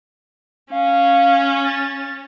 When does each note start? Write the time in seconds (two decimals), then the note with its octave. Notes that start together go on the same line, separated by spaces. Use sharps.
0.71 C#4 F5
1.64 A6